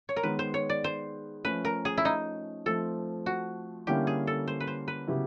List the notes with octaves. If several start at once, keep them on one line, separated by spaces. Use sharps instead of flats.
C#5
A#4
D#3 G#3 B3 B4
C5
C#5
D5
C5
F3 A3 C#4 B4
A#4
G#4
E4
D#4
F3 A3 C4 A4
F#4
D3 G3 A#3 C#4 E4 G4
G#4
A4
C5
B4
C5
B4
C#3 F#3 B3 E4 G4